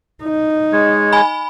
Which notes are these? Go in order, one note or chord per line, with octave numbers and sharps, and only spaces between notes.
D#4
G#3 C#5
G#5 B5